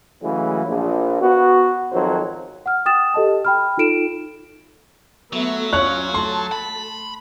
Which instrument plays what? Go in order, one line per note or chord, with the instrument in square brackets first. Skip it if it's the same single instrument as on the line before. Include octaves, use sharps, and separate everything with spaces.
[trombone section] C#3 E3 F#3 G#3 A3
A#1
B3 F#4
G#1 F2 D#3 F#3 C5
[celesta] F#5 F6
G5 D#6 A6 E7
G4 A4 D#5 A5
G5 B5 F6
D#4 F4 A4 D7 E7
[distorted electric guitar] F#3 [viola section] A3 B3 E5
[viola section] C#4 F4 [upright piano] C#5 F#6
[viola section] A3 A5 [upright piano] C6
[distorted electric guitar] B5